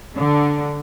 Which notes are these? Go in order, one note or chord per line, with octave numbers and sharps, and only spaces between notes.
D3